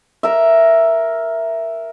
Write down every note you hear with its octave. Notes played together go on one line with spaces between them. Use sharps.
A#4 E5